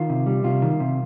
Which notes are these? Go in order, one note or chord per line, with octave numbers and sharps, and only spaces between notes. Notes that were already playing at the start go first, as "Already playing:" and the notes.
Already playing: D#3 F4
C3
G3
C3 F4
D#3
C3